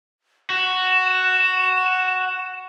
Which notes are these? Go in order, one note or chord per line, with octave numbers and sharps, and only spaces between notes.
F#4 E7